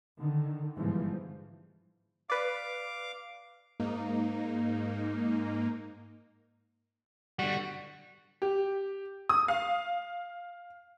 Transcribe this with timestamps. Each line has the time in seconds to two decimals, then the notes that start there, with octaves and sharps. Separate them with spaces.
0.19 D3 D#3
0.77 G1 G#2 E3 F3
2.30 B4 D5 F5 D6
3.80 G#2 A#3 D#4
7.39 D3 G3 F#4
8.42 G4
9.29 D#6
9.48 F5